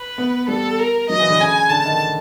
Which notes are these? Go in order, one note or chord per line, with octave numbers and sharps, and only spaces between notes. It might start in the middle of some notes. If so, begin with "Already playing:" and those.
Already playing: B4
B3
G3 A4
A#4
F#3 D#5
E3
D3
C#3 G#5
D3 A5
D#3